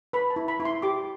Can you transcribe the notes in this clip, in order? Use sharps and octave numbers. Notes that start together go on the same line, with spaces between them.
B4 B5
A5
E4
B5
E4
C6
G4 D6